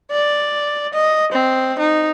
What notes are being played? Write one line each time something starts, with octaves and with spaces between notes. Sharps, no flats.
D5
D#5
C4
D#4